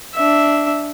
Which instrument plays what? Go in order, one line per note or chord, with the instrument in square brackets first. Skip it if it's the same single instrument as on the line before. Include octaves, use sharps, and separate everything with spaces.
[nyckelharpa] D4 E5